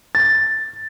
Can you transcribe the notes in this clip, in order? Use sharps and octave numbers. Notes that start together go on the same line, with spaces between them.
A6